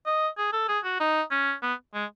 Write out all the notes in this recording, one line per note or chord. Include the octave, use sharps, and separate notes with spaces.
D#5
G#4
A4
G#4
F#4
D#4
C#4
B3
G#3